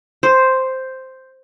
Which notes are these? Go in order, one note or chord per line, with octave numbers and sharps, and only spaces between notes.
C5